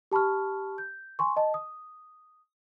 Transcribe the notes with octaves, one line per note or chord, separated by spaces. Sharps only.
G4 A5 B5 C#6 F6
G6
G#5 C6 C#6
D#5 A5
D#6